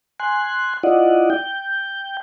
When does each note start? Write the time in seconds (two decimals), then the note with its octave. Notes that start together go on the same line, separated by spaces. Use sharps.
0.20 G#5 C6 F#6
0.83 E4 F4 D5 D#5 F#5
1.30 G5 G6